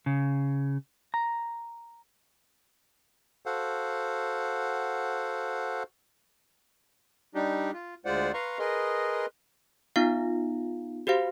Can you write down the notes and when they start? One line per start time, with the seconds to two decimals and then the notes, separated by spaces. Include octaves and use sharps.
0.06 C#3
1.14 A#5
3.46 F#4 A4 C5 F5 F#5
7.35 G3 D4 D#4 G4
7.74 F4
8.05 D2 G#3 F4 C5 D5 F#5
8.34 B4 F5 A#5 C6 C#6
8.59 G#4 A#4 B4 D#5 C6
9.96 B3 D#4 F4 F5
11.07 F#4 G4 C5 F5